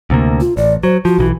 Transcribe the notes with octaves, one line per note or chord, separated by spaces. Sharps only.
D2 C3 A#3
F4
A1 D5
F#3 C5
F3 F#4
B1 D#3 E3